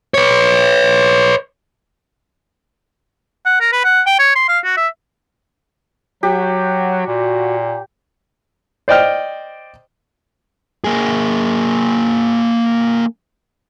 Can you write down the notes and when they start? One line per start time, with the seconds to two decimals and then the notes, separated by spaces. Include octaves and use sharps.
0.14 B4 C#5
3.46 F#5
3.61 A#4
3.72 B4
3.84 F#5
4.06 G5
4.19 C#5
4.35 C6
4.49 F5
4.64 F#4
4.77 E5
6.23 F#3 F#4 G4
7.07 A#2
8.88 C5 D5 D#5 G5 F6
10.84 A#3 G#4